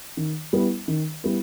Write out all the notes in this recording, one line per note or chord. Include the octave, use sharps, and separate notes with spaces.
D#3
G3 B3 E4
D#3
G3 B3 E4